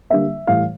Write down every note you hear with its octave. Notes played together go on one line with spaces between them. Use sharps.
D3 G3 A#3 E5
A2 E3 G3 F5